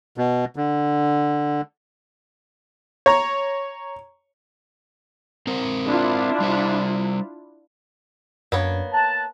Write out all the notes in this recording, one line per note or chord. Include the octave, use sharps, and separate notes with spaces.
B2
D3
C#5 A#5
C4 A#4 C5
D4 E4 F4
G3 C5
F#2 A#3 B3 D4 C#5
A5 A#5 F#6